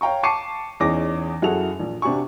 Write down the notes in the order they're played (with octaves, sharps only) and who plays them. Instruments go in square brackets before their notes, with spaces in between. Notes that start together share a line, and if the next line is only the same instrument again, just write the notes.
[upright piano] C#5 F5 G5 A#5 C#6
A5 C#6 D6 C7 C#7 D#7
E2 C#4 D#4 G#4 D6 A#6
F#2 E4 F#4 G#4 A4 F7
A#1
C3 D4 F#4 G#5 C#6